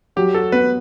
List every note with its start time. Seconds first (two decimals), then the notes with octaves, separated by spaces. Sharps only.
0.16 F#3 G4
0.34 F#4 A4
0.52 B3 B4